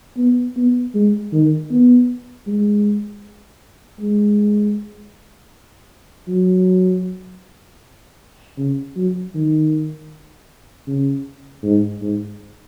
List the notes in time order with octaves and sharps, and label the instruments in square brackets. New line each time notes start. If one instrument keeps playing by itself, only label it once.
[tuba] B3
B3
G#3
D#3
B3
G#3
G#3
F#3
C#3
F#3
D#3
C#3
G#2
G#2